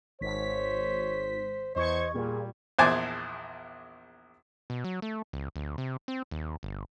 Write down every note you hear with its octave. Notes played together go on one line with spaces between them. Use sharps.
G#1 C5 C#5 B6
E2 C5 D#5 C#6 G#6
A#2 G3 G#4
A#1 E2 C5 G#5 A5 D6
B2
F#3
A3
C#2
D2
C3
C4
D#2
G1